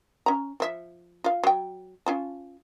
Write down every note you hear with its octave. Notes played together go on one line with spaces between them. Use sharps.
C#4 A#5
F3 E5
F4 F5
F#3 G5
C#4 F4 A5